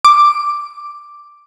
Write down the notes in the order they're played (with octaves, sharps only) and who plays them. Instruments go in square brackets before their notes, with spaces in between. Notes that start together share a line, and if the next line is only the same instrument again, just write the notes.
[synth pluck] D6